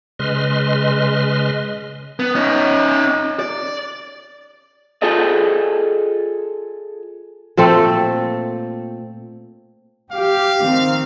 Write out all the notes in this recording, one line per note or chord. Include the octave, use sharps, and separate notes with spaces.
C#3 G#3 B4 D#5 C6 F6
B3
C#4 D#4
D5
F4 G#4 A4 D5 D#5
A#2 A3 C4 A4
G4 F5
D#3 C4